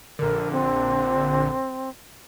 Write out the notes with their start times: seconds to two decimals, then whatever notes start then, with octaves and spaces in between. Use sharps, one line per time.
0.19 A#1 D3 A#4
0.52 C4